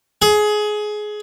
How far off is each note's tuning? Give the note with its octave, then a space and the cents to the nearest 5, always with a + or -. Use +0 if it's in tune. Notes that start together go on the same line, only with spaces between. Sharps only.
G#4 +20